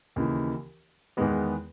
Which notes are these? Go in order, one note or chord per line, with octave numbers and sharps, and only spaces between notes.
D#2 C#3 E3
E2 D#3 G#3 B3